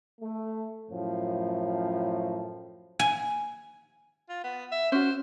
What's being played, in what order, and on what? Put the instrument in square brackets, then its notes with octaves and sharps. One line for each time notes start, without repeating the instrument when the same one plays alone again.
[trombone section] A3
F#2 A2 F3
[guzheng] G#5
[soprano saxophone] F4
B3
E5
[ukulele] C#4 F#4 [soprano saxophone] C5